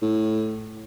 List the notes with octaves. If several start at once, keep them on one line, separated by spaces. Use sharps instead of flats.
A2